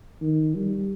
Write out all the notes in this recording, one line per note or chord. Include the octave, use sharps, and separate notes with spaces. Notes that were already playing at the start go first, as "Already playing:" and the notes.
D#3
G3